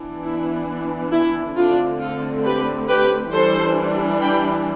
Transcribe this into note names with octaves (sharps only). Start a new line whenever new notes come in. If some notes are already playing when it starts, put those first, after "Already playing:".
Already playing: E3 B3 D4
E4
E4
D3 A3 C4 D4 F4
F4 A4
G4 B4
G4 B4
E3 G3 D4 A4 C5
G5 B5